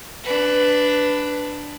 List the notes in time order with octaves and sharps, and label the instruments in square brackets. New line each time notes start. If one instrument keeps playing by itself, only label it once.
[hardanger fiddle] D4 B4